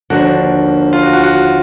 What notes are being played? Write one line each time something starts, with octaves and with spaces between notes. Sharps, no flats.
D#2 D3 F3 A#3 D4 F#4
F4
F#4
F#4
F#4